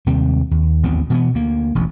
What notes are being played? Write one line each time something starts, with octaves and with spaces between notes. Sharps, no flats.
D#2 C3 G3 C4
D#2
A1 D#2 B3 C4
B2 E3 B3
D2 A#3
E1 A1 D#2